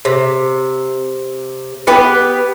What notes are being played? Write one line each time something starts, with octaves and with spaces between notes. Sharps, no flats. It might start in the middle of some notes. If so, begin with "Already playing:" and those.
C3
B3 G4 B4